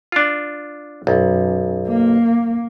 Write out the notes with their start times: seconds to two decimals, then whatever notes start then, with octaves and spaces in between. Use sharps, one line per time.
0.12 D4 F4
1.07 B1 F#2
1.88 A#3